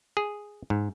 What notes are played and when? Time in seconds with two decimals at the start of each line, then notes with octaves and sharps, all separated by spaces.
0.17 G#4
0.70 G#2